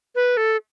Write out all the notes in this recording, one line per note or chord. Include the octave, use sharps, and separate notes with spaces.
B4
A4